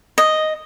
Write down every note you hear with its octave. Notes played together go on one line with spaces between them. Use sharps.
D#5